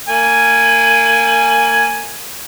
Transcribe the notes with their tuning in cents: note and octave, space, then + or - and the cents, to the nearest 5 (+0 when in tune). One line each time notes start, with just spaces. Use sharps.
A#3 -25 G#5 +0